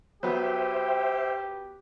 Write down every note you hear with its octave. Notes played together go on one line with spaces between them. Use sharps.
F#3 B3 G4 C5 E5 G5